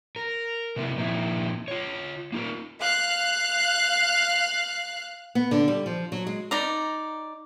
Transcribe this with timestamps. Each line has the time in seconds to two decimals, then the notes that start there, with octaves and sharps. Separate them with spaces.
0.16 A#4
0.76 C3 A3 B3 C4 E4
0.97 A#2 F3 A#3 C4 D#4 E4
1.68 F4 C#5
2.32 A#3 D#4 F4 A#4
2.80 F5 F#6
5.35 B3
5.51 D3
5.68 G3
5.86 F3
6.12 F#3
6.27 G#3
6.51 D#4 D5 A#5